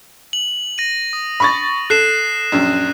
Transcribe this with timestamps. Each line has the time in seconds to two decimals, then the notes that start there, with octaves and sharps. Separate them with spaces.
0.33 F#7
0.78 A#6 D#7
1.13 D#6
1.40 B5 C#6 A6
1.90 A4 F#6 C7 E7
2.52 A#1 F#2